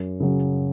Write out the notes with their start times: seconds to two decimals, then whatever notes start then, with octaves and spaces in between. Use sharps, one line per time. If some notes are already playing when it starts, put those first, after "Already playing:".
Already playing: F#2
0.20 C#3 F#3